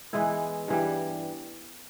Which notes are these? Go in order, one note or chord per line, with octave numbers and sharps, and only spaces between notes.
E3 G#3 B3 E4
G2 E3 G3